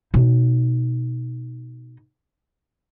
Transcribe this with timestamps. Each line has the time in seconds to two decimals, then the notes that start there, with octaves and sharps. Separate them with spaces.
0.14 B2 D#4